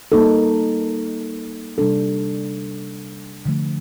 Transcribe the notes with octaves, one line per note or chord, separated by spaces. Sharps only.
G3 A#3 D#4 A4
C3 G3 D4 A4
D3 F3 A3